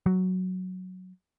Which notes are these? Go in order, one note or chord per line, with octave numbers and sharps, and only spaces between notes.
F#3